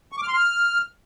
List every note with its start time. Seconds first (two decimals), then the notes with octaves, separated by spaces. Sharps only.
0.12 C#6
0.17 D6
0.23 F6
0.28 C6
0.33 F6